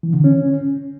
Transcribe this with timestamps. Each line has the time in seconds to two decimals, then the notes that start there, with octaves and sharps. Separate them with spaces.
0.03 E3
0.14 D3
0.24 C#4